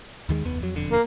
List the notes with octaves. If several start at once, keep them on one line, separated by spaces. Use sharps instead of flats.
D#2 D#3 G#3
F1 D#2 B3
F2 F#3
E1 F2 D3
A#3